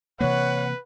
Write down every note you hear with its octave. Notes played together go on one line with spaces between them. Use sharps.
C3 E3 A#3 B4 C#5 F#5